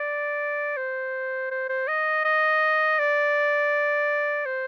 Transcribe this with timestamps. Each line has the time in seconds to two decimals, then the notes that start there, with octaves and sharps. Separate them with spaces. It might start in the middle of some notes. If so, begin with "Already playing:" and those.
Already playing: D5
0.77 C5
1.51 C5
1.69 C5
1.88 D#5
2.25 D#5
2.99 D5
4.46 C5